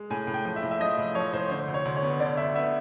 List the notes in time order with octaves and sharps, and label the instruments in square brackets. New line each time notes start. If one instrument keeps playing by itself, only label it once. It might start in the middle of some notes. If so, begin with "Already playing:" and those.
Already playing: [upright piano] G#3
A2 G#5
A2
G5
F3
E5
A2
E5
F3 D#5
A2
F3 C#5
A2 C5
D3 C5
D2
C#5
D2
C#5
B3
D3 D5
D2 E5
B3 E5